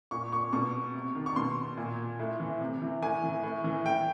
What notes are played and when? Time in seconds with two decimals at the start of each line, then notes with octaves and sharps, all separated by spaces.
0.11 A#2 C#6
0.32 C#6
0.53 B2 C#6
0.95 C3
1.15 D#3
1.26 C#6
1.36 B2 C6
1.77 A#2
2.19 A2
2.40 E3
2.61 C3
2.82 E3
3.02 A2 G#5
3.24 E3
3.43 A2
3.64 E3
3.85 A2 G5